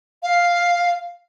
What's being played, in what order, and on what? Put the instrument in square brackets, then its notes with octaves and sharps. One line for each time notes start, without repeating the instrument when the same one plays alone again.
[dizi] F5